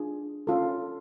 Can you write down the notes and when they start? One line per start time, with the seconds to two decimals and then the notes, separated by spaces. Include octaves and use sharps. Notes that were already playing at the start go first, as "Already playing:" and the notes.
Already playing: D4 F4 G#4
0.47 C#4 F4 A4